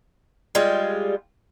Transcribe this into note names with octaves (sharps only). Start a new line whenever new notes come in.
G3 G#3 F4